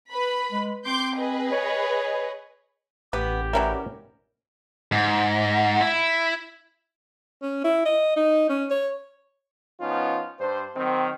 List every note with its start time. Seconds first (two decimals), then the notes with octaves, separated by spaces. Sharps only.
0.11 B4 B5
0.52 G#3
0.86 C4 C6 D6 G6
1.17 G#4 B4 D#5
1.52 C#5
3.13 A1 B3 G4 B4
3.53 E3 F#3 G3 C#4 A#4 E5
4.92 G#2
5.81 E4
7.42 C#4
7.64 E4
7.85 D#5
8.16 D#4
8.49 C#4
8.70 C#5
9.81 F3 B3 C#4 D#4 F4
10.40 G2 D4 C5
10.76 D#3 F#3 C4